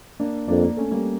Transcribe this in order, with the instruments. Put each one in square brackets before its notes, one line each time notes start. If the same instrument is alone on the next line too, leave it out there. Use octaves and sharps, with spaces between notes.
[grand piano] A#3 D4
[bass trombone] F2 [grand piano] A#3 D4
[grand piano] A#3 D4
A3 C#4
G3 A#3